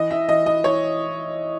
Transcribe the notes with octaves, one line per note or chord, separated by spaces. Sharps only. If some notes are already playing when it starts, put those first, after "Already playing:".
Already playing: E3 D#5
E3 E5
E3 D#5
E3 D#5
E3 C#5